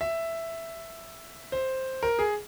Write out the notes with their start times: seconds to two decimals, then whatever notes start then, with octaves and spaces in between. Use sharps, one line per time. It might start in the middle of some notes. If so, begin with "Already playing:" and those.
0.01 E5
1.52 C5
2.03 A#4
2.19 G#4